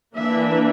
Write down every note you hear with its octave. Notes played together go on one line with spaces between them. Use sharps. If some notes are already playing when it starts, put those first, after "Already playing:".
E3 A#3 D4 E5